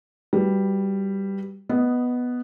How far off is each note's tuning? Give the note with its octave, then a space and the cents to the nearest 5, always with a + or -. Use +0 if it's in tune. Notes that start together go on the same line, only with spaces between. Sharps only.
G3 +0 F#4 +0 B4 +0
B3 +0 D#5 +0